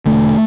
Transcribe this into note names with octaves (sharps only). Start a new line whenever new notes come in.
E1 D#2 D3 A3